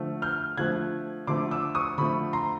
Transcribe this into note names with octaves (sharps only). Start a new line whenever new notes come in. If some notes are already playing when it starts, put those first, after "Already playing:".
Already playing: D3 F3 A3
F6 G6
D3 F3 A3 F#6 G#6
D3 F3 A3 C6 D6
D6 E6
C#6 D#6
D3 F3 A3 B5 C#6
A#5 C6